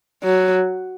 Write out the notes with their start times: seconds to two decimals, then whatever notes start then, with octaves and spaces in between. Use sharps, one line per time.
0.24 F#3